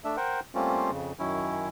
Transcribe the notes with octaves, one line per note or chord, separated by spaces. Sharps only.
A3 D4 E5
A#4 C5 F#5 G5
G3 A3 A#3 C4 C#4 F4
F2 C#3
F#2 D#3 F#3 C#4 E4